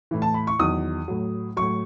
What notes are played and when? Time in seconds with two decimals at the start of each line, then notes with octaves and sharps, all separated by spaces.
0.11 A2 E3
0.22 A5
0.34 B5
0.47 C#6
0.59 E2 D#3 F#3 D#6
1.08 A2 F#3
1.57 A2 F#3 C#6